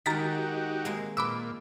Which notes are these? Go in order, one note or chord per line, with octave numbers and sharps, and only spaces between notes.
D#3 G#3 D#4 F#4 G4 A#5 A6 B6
G#3 A#3 C4
A#2 B4 G5 B5 D6 E6